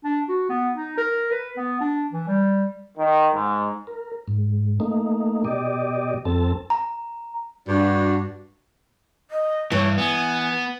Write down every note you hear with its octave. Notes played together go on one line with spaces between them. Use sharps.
D4
F#4
B3
D#4
A#4
B4
B3
D4
E3
G3
D#3
G#2
A#4
G#2
A3 A#3 D#4
B2 G4 D5 D#5
F2 C4 A4 A5
A#5
G2 D4 F#4 D5
D#5
G2 E3 C#5
B3 G#5